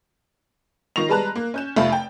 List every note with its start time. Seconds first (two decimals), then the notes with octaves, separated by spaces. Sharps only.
0.96 D#3 F4 C#6 A#6 C7 F7
1.09 G3 G#3 B4 A5 A#5 F#6
1.35 A#3
1.54 C#4 G6 E7
1.76 F1 A3 F4 F5 B5
1.92 G5